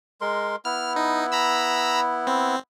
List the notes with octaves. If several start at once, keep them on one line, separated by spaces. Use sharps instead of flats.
G#3 A#4 C6
B3 E4 F6
D#4
A#5 B5 E6
C4